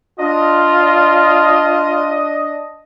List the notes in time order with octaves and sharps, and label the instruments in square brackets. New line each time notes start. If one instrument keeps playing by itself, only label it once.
[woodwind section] D4 D#5 [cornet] F4